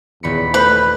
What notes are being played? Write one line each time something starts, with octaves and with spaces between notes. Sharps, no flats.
D#1 E2 B5 C#7
A3 B4 C5 G6